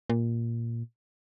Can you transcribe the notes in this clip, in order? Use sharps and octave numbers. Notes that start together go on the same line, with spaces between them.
A#2